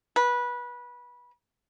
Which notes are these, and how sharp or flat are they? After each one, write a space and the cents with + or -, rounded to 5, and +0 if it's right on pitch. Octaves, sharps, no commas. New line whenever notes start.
B4 -20